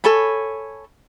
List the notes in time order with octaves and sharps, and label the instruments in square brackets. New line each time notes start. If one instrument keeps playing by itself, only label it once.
[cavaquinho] A4 C#5 G#5 B5